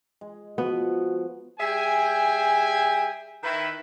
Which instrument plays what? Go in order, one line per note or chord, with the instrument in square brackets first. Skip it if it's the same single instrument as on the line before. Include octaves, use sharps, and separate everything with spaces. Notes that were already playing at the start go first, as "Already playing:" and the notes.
[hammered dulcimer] G#3
[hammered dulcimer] F3 C#6 [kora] B3 [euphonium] F#4
[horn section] G3 G#4 E5 G5 G#5
D#3 E4 B4